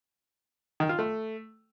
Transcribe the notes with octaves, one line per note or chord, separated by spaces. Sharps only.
D#3
F4
A3